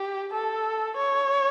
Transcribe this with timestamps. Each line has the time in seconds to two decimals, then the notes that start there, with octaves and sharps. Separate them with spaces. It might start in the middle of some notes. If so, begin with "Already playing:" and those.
Already playing: G4
0.34 A4
0.97 C#5